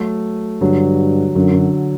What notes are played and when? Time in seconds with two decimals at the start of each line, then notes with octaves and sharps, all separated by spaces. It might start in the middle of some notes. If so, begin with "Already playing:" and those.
Already playing: F#3 A3
0.61 G2 D3 F#3
1.35 F#2 D3 F#3
1.54 D3